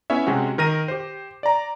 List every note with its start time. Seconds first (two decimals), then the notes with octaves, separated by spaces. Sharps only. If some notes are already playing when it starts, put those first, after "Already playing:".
0.10 B3 C#4 E4 C#5 E5
0.26 C3 G#3 C#4 F#4
0.58 D#3 A#4 A#6 D#7
0.88 G4 C5
1.43 D5 A#5